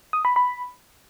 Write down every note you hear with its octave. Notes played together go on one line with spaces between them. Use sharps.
D#6
B5
B5